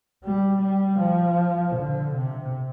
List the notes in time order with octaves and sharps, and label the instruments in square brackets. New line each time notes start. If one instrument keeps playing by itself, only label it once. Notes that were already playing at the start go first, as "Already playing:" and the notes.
[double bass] G3
G3
F3
D3
C3